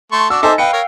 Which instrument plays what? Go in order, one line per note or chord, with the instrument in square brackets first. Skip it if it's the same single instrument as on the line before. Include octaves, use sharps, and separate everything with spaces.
[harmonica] A3 C6 C#6
[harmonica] D4 F#4 [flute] D6 [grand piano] E6
[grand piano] D#4 A4 G#5 [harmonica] C5 E5
[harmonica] B4 D#5 [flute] F5 [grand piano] G5 C#7
[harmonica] A#4 C#5